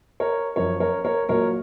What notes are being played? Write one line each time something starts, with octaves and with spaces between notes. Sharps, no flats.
A#4 C#5
F#2 F3 A#4 C#5
A#4 C#5
A#4 C#5
A#2 F#3 A#4 C#5